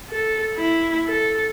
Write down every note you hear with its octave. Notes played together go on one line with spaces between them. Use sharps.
A4
E4
A4